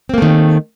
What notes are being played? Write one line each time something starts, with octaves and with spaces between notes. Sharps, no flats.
D#3 A3 A#3 C4